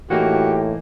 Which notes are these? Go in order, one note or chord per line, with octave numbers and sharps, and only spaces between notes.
A2 E3 A#3 D#4 F#4 G4